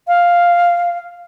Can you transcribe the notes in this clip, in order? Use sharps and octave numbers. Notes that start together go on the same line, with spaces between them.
F5